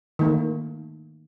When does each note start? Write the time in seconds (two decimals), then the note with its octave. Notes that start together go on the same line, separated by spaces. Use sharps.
0.19 D#3 A3 A#3